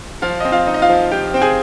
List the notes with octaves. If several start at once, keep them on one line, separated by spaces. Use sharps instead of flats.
F3 F4 F5
C4 D#5
F4 F5
D#4
D#5
F4 F5
F3
F3 G4 G5
C4 G5
G#4 G#5